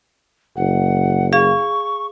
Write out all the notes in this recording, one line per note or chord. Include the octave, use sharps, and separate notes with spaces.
F#1 F#5
G#4 F5 C#6